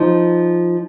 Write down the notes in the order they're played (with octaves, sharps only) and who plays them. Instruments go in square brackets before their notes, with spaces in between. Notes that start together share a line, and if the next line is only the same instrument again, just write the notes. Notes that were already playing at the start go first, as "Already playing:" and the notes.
Already playing: [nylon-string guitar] F3 D#4